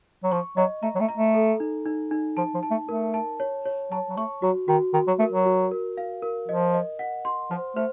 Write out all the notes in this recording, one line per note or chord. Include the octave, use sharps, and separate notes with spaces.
F#3
F3 C#6
F#3 D#5
A3 A#5
F#3
A3
A#5
A3
A4
D#4
D#4
D#4
F3 A5
F3
A5
A3
A3 A#4
A5
C#5
C#5
F#3 A5
F#3
A3 C#6
F#3 F#4
D#3 F#4
D#3 F#4
F#3
A3 A#4
F#3
F#4
A#4
F5
A#4
F3 D#5
D#5
F#5
C6
F3 C5
A3 C5